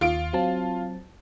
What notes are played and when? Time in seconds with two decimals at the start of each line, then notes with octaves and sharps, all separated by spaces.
0.01 D#2 F4 D7
0.33 F#3 C4 A5